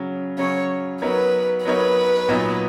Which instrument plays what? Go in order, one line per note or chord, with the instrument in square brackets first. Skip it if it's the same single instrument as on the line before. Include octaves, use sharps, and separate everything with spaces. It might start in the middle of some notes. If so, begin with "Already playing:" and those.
Already playing: [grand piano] C#3 F#3 C#4
[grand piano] C#3 F#3 C#4 [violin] C#5
[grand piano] F#3 B3 D#4 A#4 C#5 [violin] B4
[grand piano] F#3 B3 D#4 A#4 C#5 [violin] B4
[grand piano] A#2 F#3 B3 D#4